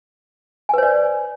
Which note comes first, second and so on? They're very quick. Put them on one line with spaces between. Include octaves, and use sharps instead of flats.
G#5 B4 C5 D5